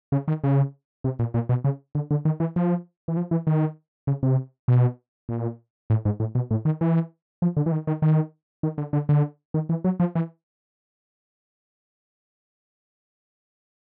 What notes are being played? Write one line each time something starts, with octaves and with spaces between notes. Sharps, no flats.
C#3
D#3
C#3
C3
A#2
A#2
B2
C#3
D3
D3
D#3
E3
F3
E3
F3
E3
D#3
C#3
C3
B2
A#2
A2
G#2
A2
B2
A2
D#3
E3
F3
D3
E3
D#3
D#3
D#3
D#3
D3
D3
D3
D#3
E3
F#3
F3
E3